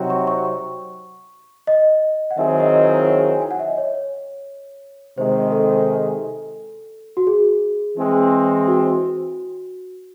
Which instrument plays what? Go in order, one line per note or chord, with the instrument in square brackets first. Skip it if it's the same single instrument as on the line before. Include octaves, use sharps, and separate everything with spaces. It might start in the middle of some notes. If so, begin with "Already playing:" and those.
Already playing: [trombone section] C3 F#3 C4 D#4 F#4
[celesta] C#6
C#6
D#5
F#5
[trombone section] D#3 F#3 C4 E4 G#4 [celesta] E5
[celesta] D#5
C#5
G#5
F#5
E5
D#5
C#5
[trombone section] C3 D#3 G#3 C4 [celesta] C5
[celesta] A4
F#4
G#4
[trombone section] E3 G#3 C4
[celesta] F#4